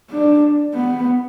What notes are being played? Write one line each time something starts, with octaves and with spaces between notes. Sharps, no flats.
D4
B3